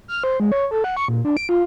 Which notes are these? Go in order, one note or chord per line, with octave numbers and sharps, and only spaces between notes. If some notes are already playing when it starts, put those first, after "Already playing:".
F6
C5
G#3
C#5
A4
F#5
C#6
A#2
D4
D7
F4